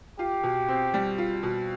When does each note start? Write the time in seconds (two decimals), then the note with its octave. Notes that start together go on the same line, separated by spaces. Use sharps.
0.19 F4 G4
0.44 B2
0.68 C4
0.94 G3
1.18 F4
1.43 B2